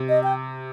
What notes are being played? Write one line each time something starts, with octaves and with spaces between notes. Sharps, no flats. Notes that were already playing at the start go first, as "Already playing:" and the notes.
Already playing: C3
D#5
G5